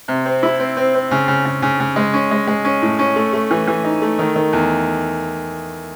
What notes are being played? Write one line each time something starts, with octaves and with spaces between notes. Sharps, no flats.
C3
C4
E4
C4
C4
C4
C#3
C#3
C#3
C#3
C#3
G#3
C#4
G#3
G#3
C#4
A2
C#4
A3
A3
E3
E3
D#4
A3
D#3
D#3
E2